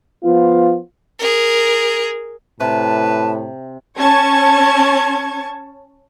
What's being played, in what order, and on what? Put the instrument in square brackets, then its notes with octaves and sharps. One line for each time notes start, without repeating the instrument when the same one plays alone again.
[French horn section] F3 B3 F4
[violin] G#4 A#4
[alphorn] A2 [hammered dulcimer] C3 [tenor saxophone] B4 [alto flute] A5
[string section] C#4 A5 C#6 G#6